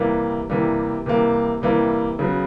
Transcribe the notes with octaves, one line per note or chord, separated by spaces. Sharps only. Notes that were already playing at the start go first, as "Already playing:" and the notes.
Already playing: C3 E3 G3 A#3
C3 E3 G3 A#3
C3 E3 G3 A#3
C3 E3 G3 A#3
C#3 F#3 B3